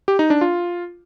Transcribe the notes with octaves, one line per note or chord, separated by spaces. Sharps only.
G4
D#4
D4
F4